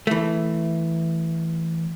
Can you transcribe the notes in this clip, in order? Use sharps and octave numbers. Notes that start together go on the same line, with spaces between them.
E3 A3